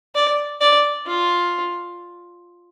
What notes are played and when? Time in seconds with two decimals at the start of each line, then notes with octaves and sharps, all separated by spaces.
0.15 D5
0.61 D5
1.07 F4